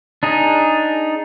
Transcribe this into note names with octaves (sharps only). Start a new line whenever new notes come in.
D4 D#4 G#4